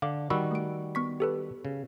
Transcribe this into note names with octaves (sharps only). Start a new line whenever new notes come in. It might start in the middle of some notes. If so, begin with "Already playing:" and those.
D3 F5 D6
D#3 G3 F#4 B5 C#6 E6
A3 D7
B3 C#6 B6
G4 A4 B4
C#3